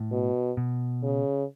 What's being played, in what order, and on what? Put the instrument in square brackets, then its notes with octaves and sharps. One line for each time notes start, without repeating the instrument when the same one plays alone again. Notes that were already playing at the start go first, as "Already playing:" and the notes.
Already playing: [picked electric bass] A2
[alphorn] B2
[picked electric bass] B2
[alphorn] C#3